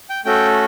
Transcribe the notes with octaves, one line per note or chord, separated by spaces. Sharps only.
G5
A3 C#4 F#4 A4 G5